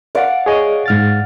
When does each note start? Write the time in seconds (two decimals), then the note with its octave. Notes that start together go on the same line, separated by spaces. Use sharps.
0.15 D5 F5 F#5
0.46 G#4 C#5 D#5
0.86 G#2 F6 A6